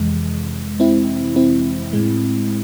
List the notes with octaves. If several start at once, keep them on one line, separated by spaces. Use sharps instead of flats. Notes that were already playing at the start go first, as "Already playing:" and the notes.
Already playing: F2 C3 E3 G#3
C4 E4
C4 E4
A2 G#3